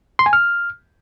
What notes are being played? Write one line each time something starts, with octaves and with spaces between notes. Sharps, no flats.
C6
G#5
F6